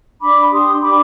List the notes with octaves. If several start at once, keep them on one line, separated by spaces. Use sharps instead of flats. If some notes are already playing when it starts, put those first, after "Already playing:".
D4 B5 D6
G4 C6 D#6
D4 B5 D6